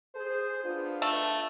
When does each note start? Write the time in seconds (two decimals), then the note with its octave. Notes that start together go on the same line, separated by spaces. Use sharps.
0.15 G#4 C5
0.65 B3 D4 F4
1.02 A3